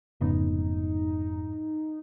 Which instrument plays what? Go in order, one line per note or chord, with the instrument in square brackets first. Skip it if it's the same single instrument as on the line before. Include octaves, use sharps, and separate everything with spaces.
[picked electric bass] F1 C#3 B3 [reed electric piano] F2 G#2 [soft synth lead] D#4